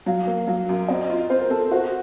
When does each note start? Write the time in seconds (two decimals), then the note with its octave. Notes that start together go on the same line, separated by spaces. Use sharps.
0.06 F#3 F5
0.27 A#3
0.47 F#3 F5
0.69 F#2
0.88 C4 D#5
1.10 F4
1.30 C4 C5
1.41 A#4
1.50 C4 A4
1.60 A#4
1.71 F#4 C5